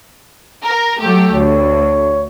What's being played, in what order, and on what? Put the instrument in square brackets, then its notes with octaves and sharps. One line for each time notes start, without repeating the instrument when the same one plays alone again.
[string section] A#4
F#3 A3 G4
[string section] D2 [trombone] C#5